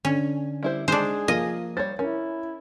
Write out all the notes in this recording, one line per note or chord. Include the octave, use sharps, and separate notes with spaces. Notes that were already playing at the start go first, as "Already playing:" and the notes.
D3 C#4
G3 E4 C5
G#3 D4 D#4 G#4 C5
F3 A#3 F4 D#5
G3 C5 C#5 A6
C#4 E4 A#4 C#5